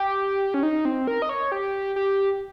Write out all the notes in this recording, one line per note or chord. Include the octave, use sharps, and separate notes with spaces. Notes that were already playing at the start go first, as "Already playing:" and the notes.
Already playing: G4
C#4
D#4
C4
A#4
D#5
C#5
G4
G4